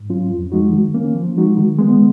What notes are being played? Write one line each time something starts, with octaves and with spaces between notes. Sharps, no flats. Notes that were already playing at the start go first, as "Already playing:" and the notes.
Already playing: G#2
F#3 C#4 F4
F2
F3 G#3 D#4 F#4
D#3
A#3 C#4
F3
G#3 D#4 F#4
D#3
G#3 B3